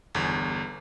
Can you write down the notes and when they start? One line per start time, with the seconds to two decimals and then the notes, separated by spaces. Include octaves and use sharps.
0.15 G1 E2